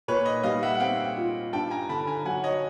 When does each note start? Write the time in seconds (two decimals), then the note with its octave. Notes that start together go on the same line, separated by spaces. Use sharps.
0.08 A#2 B4 C#5
0.25 C#5 D#5
0.43 G3 D#5 F5
0.63 E5 F#5
0.75 F#5
0.80 C4 F5 G5
1.16 F4
1.53 G2 G5 A5
1.71 G#5 A#5
1.89 D3 A5 B5
2.07 G#5 A#5
2.25 F#3 F#5 G#5
2.43 C#5 D#5